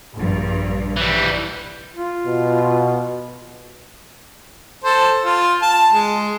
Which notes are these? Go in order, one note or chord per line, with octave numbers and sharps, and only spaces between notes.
A#1 G2
E3 G3
F4
B2
A4 C5
F4
A5
G#3